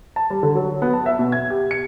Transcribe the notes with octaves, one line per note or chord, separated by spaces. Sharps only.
A5
G3
D3
F#3
B3
A5
E5
B2
G#6
G4
C#7